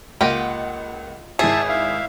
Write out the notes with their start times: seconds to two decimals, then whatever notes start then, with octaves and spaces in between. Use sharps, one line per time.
0.21 C#2 A#3 F4 G4 D#5 F#5
1.39 G#1 E4 G#4 E5 A5 C7
1.69 E5 F5